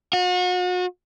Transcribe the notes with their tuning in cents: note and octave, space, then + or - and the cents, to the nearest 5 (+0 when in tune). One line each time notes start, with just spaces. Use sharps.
F#4 -40